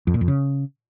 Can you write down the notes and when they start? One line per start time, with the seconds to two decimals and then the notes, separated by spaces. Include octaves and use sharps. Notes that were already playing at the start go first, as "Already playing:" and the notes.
0.07 F2
0.14 A#2
0.21 F2
0.28 C#3